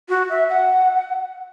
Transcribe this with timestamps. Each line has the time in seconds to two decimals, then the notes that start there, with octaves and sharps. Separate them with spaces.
0.09 F#4
0.29 E5
0.49 F#5